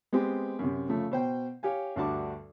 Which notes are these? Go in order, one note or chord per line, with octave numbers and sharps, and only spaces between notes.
G#3 B3 C4 G4
F#2 C3
C#3 F3 A3
B2 C5 G5
G4 C#5 F5 G#5
D2 G2 D4 F#4 A5 D6